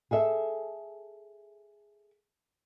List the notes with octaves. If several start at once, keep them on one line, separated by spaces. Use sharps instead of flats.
G#4 A4 E5